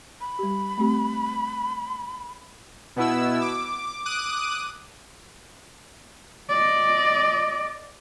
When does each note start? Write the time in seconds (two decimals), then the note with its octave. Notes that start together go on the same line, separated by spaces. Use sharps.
0.21 B5
0.39 G3 G4
0.78 A3 C4 G4
2.96 B2 B3 E4 E6
3.42 D6
4.05 D6 D#6 F#6 D#7
6.50 D5 D#5